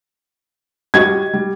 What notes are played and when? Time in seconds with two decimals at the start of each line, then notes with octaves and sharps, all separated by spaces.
0.94 G3 F#4 D#5 G#6
1.34 G3